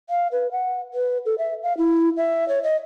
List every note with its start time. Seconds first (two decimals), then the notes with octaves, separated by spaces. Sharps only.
0.10 F5
0.32 B4
0.52 F#5
0.94 B4
1.26 A4
1.38 E5
1.63 F5
1.78 E4
2.17 E5
2.49 C#5
2.63 D#5